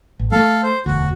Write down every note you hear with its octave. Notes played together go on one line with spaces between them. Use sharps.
A1
G#3 A3 A4 F5
C5
E1 D2 F#4